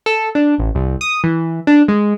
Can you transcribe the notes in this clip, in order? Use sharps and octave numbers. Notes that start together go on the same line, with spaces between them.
A4
D4
A1
C2
D#6
E3
D4
G#3